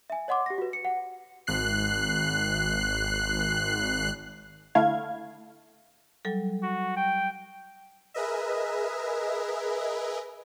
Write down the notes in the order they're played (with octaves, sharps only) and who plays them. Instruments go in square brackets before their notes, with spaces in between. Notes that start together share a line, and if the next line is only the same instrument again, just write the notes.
[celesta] E5 G#5
C#5 D#5 F#5 C6 D6
G4 A#6
F#4 B4
C#7
F#5
[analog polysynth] G#1 F#6 C7
[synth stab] D3 A3 E4 F5 G#6
[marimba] F#3 G3 A4
[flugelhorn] F#4
G5
[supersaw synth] G#4 A#4 B4 D#5 E5